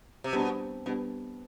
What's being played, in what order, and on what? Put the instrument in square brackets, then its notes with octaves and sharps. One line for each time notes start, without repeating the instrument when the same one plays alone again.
[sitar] C3
[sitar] B2 [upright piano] G3 B3 D4
[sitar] B2 [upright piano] G3 B3 D4